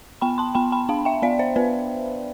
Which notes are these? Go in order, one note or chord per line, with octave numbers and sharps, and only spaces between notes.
B3 G5 B5
A5 C6
B3 G5 B5
G5 B5
D4 F5 A5
E5 G5
B3 D5 F5
C5 E5
B3 B4 D5